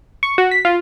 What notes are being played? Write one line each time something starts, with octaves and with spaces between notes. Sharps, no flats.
C#6
F#4
B6
F4